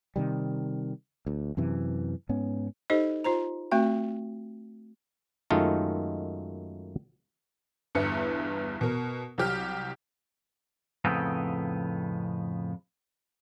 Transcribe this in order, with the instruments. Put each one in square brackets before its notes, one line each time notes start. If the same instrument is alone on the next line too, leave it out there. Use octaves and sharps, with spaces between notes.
[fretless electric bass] C3 D#3 G3
D2
F#2 C3 E3
G#2 B3 C#4
[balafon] D#4 G4 A4 C5 D#5
F4 C5 A#5
A3 C4 F#4 G5
[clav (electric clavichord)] F#2 D#3 G#3 A3 D#4 F4
[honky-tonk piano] G1 E2 G2 B3 E4 C#7
B2 A#4
C2 F#3 G4 F6
[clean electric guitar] F2 A2 C#3 B3 C4 D#4